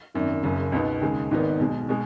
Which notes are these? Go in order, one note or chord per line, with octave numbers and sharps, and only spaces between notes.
G#1 F#2 D#3
F#1 F#2 C#3
C#2 B2 B3 D#4
D#2 C#3 G#3
G#1 G#2 D#3 B3 D#4
B1 B2 G#3
B2 G#3